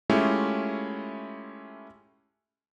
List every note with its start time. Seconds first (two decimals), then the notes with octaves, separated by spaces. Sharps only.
0.10 G#3 A3 C#4 E4 F4 G4